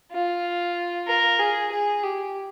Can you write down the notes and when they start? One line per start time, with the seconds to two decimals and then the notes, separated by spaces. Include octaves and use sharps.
0.12 F4
1.07 A#4
1.40 G#4
1.71 G#4
2.03 G4